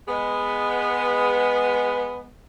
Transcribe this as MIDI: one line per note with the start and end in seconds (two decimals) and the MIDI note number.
0.08 2.29 56
0.08 2.29 59